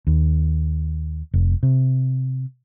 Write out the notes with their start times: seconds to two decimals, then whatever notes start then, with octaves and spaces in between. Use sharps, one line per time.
0.07 D#2
1.34 F1
1.63 C3